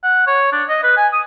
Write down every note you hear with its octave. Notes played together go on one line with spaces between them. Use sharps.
F#5
C#5
D4
D#5
B4
G#5
D#6